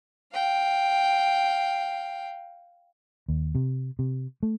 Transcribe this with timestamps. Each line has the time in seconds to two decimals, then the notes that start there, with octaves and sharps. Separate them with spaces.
0.33 F5 G5
3.28 D#2
3.55 C3
3.99 C3
4.43 A3